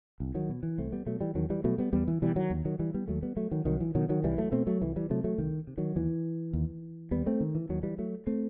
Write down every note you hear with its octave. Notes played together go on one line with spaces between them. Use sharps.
C2
D#3 F#3
B2
E3
C2 A3 C4
G3 B3
B2 F#3 A3
E3 G3
E2 D#3 F#3
E3 G3
B2 F#3 A3
G3 B3
E2 G3 B3
E3
B2 E3 G3
D#3 F#3
D#2
D#3 F#3
E3 G3
G3 B3
D#2 F#3 A3
G3 B3
F#3 A3
D#3 F#3
C2 D#3 F#3
E3
B2 D#3 F#3
D#3 F#3
C2 E3 G3
F#3 A3
B2 A3 C4
F#3 A3
C2 E3
E3 G3
C3 F#3 A3
F#3 A3
C2 D#3
C3
D#3 F#3
D#2 E3
D#2
D#2 G3 B3
A3 C4
D#3
E3
D#2 D#3 F#3
E3 G3
F#3 A3
A3 C4